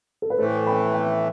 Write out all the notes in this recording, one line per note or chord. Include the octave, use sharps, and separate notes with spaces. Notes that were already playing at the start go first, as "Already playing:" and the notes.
A4
B4
A2 E3 A3 A4 C5
G5 B5
E5 G5